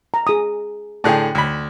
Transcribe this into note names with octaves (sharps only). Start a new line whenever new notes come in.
A#5
G#4 D#6
A2 D3 G#4 G5 A5
D2 B5